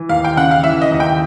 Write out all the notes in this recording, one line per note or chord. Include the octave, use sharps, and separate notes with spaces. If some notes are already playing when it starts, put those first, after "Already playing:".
Already playing: E3
D#2 F5
G5
C#3 F#5
F5
E3 E5
D#5
D#2
G5